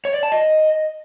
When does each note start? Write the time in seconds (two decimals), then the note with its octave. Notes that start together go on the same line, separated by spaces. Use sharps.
0.05 C#5
0.14 D5
0.23 A5
0.32 D#5